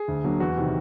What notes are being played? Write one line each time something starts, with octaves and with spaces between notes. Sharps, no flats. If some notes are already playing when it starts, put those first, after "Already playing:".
Already playing: G#4
D2
D3 F#3 A#3
E2 F#4
C3 D#3